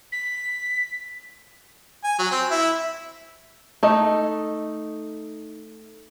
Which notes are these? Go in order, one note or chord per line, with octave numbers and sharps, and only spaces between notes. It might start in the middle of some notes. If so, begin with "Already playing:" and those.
B6
G#5
F#3
C4
E4
A3 D#4